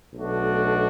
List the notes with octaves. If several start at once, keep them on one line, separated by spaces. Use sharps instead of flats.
B1 B2 A3 D4 F#4